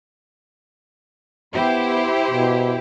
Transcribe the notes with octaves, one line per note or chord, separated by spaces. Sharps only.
B3 E4 G4 C5
B2